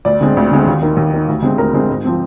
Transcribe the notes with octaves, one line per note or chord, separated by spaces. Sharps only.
D2 D5
D3 G#3 C4
D2
D3 G#3 C4
D#2
D#3 A#3
D#2
D#3 A#3
D2
D3 G#3 C4
D2 A#4
D3 G#3 C4
G#2
F3 C4